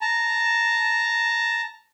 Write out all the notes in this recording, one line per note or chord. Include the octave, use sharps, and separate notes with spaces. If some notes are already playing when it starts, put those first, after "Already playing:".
A5 A#5